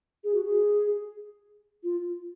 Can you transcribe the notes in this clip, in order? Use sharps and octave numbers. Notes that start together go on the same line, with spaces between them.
G#4
F#4
G#4
F4